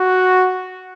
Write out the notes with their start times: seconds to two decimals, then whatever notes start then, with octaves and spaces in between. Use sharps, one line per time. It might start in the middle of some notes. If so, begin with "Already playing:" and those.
Already playing: F#4